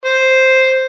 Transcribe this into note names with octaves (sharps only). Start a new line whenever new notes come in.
C5